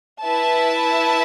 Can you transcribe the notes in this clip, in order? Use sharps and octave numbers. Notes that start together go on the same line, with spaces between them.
E4 B4 E5 A5